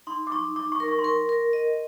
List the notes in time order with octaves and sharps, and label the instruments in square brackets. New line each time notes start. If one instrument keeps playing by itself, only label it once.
[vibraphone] D#4 [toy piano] C6
[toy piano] D6
[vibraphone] D#4 [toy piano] C#6
[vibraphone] D#4 [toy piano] D6
[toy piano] C#6
[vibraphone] A#4
[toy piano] C#6
C6
[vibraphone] A#4 [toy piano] C#6
[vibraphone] A#4
D#5